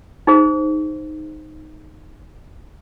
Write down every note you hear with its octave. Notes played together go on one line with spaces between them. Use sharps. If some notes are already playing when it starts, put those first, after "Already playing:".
D#4 G#4 C5